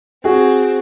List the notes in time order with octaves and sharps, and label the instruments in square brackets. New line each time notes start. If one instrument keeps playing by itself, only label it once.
[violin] C4 [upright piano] F#4 G#4